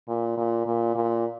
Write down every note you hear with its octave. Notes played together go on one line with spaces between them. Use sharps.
A#2
A#2
A#2
A#2